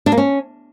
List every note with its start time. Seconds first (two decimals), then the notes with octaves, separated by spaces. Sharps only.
0.06 D4
0.12 A#3
0.18 C#4